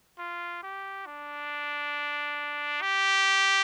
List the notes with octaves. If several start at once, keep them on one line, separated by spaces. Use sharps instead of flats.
F4
G4
D4
G4